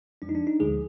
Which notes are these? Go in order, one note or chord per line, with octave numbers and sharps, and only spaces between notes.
F2 F3 G#3 D4
D#4
D4
D#4
D2 D3 F3 G#3 G#4